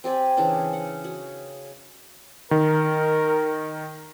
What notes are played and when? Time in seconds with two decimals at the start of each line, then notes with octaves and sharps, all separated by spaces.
0.04 C4 G4 D5 G#5
0.37 C#3 E3 D4
0.73 F#5
1.04 F#4
2.51 D#3 A#4